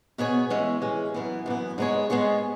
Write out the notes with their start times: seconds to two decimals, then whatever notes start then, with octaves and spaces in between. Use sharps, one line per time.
0.18 B2 B3 G#4 C#5
0.50 E3 G#3 C#4
0.81 E3 G#3 C#4
1.14 F#2 E3 B3
1.46 F#2 E3 B3
1.78 G#2 G#3 B3 G#4 C#5
2.10 G#2 G#3 B3 G#4 C#5